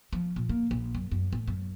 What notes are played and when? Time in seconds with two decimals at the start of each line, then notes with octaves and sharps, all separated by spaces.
0.13 F3
0.36 A#2
0.49 A#3
0.71 A#1
0.95 F#2
1.11 F#2
1.33 A2
1.47 F#2